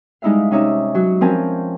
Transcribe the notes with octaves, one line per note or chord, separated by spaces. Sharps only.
G3 G#3 D#4 E4 E5 F5
C3 C#4 D#4 C#5 E5
F#3 F#4
F3 C4 C#4 A#4 G#5 A5